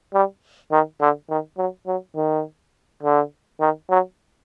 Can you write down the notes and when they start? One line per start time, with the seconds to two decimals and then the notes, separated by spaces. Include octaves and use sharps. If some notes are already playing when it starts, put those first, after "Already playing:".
0.14 G3
0.71 D#3
1.01 D3
1.29 D#3
1.58 F#3
1.87 F#3
2.16 D#3
3.03 D3
3.60 D#3
3.90 F#3